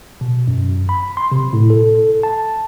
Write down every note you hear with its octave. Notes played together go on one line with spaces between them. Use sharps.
B2
F#2
B5
C6
C3
A2
A4
A5